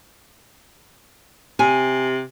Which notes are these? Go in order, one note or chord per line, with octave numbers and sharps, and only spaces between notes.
C3 G#5